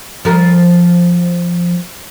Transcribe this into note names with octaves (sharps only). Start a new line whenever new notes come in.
F3 A#4